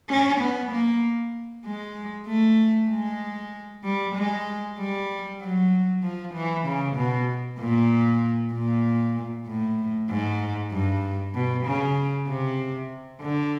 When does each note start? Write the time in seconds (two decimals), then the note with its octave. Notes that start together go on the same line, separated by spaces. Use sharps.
0.09 C#4
0.41 B3
0.72 A#3
1.65 G#3
2.28 A3
2.90 G#3
3.84 G3
4.16 G#3
4.78 G3
5.41 F#3
6.03 F3
6.35 E3
6.66 C#3
6.97 B2
7.60 A#2
8.53 A#2
9.47 A2
10.10 G#2
10.72 G2
11.35 B2
11.66 C#3
12.28 C3
13.22 D3